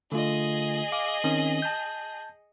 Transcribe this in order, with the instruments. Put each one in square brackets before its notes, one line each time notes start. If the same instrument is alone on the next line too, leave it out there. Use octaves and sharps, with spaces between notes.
[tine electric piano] D3 A3 F4 [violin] G#4 D#5
[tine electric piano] F5 D6
D#3 C4 C#4
A5 G6